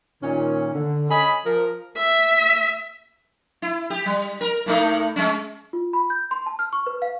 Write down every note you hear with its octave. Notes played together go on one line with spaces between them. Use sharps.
A#2 D#3 C#4
D3
C#4 D#5 G#5 B5
F3 A#4
E5
E4
G4
G3
A#4
A2 A3 D#4
G#3 C#4
F4
B5
G6
C6
A5
F6
C#6
B4
F5